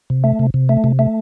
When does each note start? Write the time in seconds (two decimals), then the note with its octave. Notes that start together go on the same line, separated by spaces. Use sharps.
0.10 C3
0.24 A3
0.39 C3
0.54 C3
0.69 A3
0.84 C3
0.99 A3